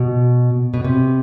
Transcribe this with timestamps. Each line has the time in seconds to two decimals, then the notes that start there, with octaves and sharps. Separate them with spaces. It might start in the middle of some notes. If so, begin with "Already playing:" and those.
Already playing: B2
0.74 B2
0.84 C3